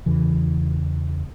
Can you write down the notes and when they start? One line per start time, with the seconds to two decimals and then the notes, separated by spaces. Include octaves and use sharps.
0.06 E2 C#3 E3